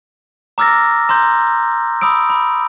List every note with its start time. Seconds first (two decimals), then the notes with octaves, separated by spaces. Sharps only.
0.58 A#5 D6 E6 F6 A6 A#6
1.09 A#5 C6 G6
2.01 B5 D#6 E6 D7
2.30 B5